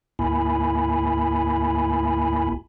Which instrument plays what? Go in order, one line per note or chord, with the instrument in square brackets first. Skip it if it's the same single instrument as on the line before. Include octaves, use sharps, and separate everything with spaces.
[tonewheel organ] D2 G#2 A#3 E4 G#5 B5